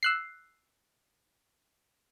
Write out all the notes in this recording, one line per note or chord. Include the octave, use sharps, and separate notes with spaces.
E6 F#6 C7